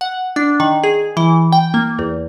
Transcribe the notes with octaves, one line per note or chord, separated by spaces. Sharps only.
F#5
D4
D#3
G#4
E3
G5
A#3
E2